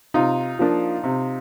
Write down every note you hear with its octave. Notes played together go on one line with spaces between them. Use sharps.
C3 D#4 F4
F3 A#3 D4
C3